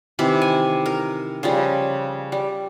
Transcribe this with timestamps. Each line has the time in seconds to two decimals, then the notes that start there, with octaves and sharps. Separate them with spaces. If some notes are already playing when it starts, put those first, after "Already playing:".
0.19 C3 D#3 E3 B5
0.42 G#5
0.86 A#4
1.43 C#3 F3 G3
2.32 G3